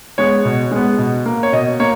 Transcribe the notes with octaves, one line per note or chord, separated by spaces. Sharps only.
G#3 B3 C#5
B2
G#3 B3
B2
A#3
C#5
B2 D#5
A#3 C#5